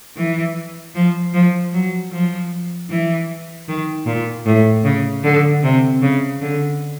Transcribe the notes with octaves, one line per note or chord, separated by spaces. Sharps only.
E3
F3
F3
F#3
F3
E3
D#3
A#2
A2
C#3
D3
C3
C#3
D3